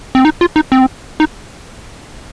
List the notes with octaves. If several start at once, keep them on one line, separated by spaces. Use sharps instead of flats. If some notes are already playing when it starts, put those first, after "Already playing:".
C4
D#4
F4
D#4
C4
D#4